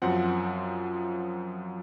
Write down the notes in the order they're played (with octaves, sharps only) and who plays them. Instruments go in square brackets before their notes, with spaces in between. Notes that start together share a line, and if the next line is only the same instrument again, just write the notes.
[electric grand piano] F#2 F3 C4 F#5